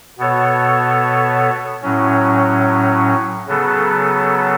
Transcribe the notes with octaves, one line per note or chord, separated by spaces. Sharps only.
B2 B3 A4 C#5
A2 F#3 C#4
C#3 F#3 B3 A4